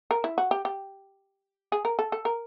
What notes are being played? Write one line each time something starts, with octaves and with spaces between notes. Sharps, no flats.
A#4
E4
F#4
G4
G4
G#4
A#4
A4
A4
A#4